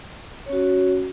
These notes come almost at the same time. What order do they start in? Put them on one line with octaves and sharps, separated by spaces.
C#5 C#4 F#4